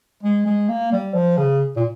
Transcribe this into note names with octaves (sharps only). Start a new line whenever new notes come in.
G#3
G#3
A#3
G3
F3
C#3
A#2